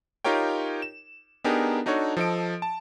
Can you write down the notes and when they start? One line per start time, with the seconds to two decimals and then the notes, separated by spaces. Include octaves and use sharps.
0.24 D#4 F4 G4 A#4 C#5 G5
0.82 E7
1.44 B3 D4 D#4 G4 G#4 A#4
1.86 D4 D#4 F#4 A4 C#5
2.17 F3 A4 D#5 D7
2.62 A5